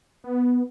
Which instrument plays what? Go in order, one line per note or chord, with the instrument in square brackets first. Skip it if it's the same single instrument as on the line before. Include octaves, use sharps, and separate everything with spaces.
[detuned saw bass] B3